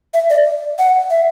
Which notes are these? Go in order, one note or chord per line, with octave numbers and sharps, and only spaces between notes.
E5
D5
F#5
E5